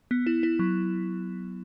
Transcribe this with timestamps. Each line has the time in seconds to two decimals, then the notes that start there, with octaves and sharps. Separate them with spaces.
0.11 B3
0.27 E4
0.43 E4
0.59 F#3